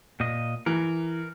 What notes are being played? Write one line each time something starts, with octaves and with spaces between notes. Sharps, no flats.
A#2 D#5
E3 A#4